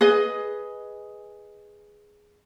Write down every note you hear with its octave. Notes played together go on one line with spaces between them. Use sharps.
G#4 B4 D#5